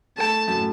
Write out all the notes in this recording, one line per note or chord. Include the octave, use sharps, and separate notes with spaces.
A3 A5
F#2
A2